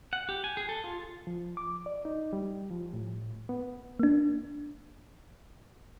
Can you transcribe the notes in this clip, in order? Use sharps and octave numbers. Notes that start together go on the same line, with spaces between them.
F#5
G4
G#5
G#4
A4
F4
F3
D6
D5
D#4
G3
F3
A2
B3
A#3 D4